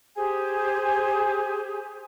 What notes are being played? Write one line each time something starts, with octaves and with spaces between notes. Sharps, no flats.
G4 G#4 C5 G#5